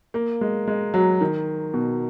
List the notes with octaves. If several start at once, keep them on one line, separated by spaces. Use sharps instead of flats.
A#3
G#3
G#3
F#3
D#3
B2